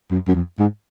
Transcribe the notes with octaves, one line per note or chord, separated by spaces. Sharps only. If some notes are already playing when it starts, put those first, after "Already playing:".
F#2
F#2
F2
G#2